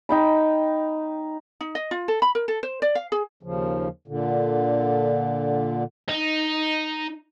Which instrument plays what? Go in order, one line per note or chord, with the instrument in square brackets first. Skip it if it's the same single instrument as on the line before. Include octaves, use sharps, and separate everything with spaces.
[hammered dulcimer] D#4 G5 B5
[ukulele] D#4
D#5
F4
A4
B5
A#4
A4
C5
D5
F5
G#4
[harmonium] D#2 C#3 F3
A#2 D3
[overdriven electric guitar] D#4